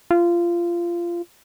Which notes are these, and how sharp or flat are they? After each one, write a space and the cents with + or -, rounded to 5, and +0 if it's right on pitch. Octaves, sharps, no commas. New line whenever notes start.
F4 -20